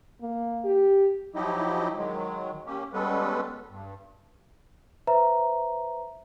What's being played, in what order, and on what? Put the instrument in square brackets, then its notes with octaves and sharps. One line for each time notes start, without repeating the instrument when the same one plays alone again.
[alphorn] A#3
G4
[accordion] F3 F#3 D#4 E4 G4 D#5
D#3 F#3 G#3
A#3 C#4 G4
G3 G#3 B3 C#4 A4 B4
G2
[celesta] B4 C5 E5 A#5